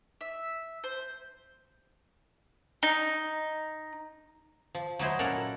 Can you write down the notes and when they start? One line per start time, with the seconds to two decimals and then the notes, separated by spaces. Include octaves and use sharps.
0.21 E5
0.84 C5
2.83 D#4
4.75 F3
4.99 F#3 D#4 E4 C5
5.19 A#2 C#4 A4 A#4 F#5